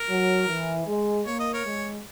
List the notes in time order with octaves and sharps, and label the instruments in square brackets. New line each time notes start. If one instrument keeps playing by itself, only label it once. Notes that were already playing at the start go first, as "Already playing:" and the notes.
Already playing: [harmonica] A#4
[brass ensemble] F#3
E3
G#3
[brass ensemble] A#3 [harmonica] C#5
[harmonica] D#5
A#4 C#5
[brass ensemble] G#3